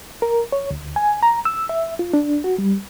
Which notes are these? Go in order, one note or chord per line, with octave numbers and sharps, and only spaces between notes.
A#4
C#5
D2
G#5
A#5
E6
E5
F4
D4
F#4
G3